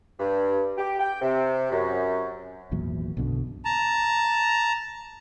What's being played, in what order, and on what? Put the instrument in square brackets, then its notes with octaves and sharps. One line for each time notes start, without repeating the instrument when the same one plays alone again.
[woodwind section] G2
G4
G5
C3
F#2
[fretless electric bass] G#1 E2 A#2 F#3
B1 F#2 B2 D3
[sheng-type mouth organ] A5 A#5